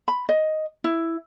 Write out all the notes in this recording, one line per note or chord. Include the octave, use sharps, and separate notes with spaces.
B5
D#5
E4